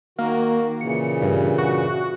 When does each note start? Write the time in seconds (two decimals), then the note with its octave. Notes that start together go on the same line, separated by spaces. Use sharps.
0.19 D#3 A#3 F#4
0.81 A#2 C#3 E3 C#7
1.22 G2
1.58 F#4